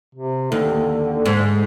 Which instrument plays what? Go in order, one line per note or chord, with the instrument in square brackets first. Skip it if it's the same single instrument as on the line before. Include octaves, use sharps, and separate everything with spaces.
[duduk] C3
[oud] D#2 [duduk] D3
[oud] G#2